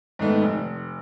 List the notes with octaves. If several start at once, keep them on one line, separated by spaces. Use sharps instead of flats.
G#2 D#3 A3 B3
F1